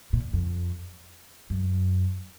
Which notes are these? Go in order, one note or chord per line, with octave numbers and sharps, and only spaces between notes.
A#2
F2
F#2